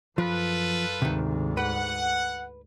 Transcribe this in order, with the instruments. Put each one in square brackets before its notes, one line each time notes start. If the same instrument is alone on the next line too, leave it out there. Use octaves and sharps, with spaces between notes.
[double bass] F#2 [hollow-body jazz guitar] F3 [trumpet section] F4 A4 B4
[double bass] D2 G#2 [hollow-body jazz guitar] C3 D#3
[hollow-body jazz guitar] B4 [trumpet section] F#5